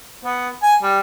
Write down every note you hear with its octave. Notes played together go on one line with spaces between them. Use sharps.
B3
G#5
G3